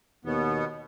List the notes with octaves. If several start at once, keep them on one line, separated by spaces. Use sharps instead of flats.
D#2 B2 B3